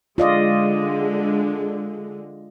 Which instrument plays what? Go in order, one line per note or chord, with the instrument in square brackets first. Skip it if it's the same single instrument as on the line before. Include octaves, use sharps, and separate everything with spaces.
[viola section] D3 G#3 [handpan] F4 D5 D#5